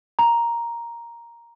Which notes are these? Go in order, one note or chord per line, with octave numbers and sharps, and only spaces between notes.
A#5